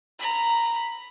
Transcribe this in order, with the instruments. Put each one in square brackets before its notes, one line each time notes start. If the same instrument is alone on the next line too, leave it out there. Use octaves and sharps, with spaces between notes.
[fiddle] A#5 B5